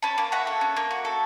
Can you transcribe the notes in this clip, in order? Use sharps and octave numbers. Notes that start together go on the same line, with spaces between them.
C#4 A5 B5
A#3
F#4 E5 F#5
A4
C#4
A#3
F#4
A4